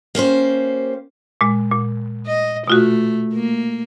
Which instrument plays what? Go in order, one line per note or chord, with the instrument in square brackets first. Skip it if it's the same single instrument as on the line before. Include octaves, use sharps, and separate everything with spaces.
[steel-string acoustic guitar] A#3 C#4 G4 C5
[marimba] A#2 G#3
A#2
[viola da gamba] D#5
[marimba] B2 F4 F#4 [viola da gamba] A3
[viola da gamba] A#3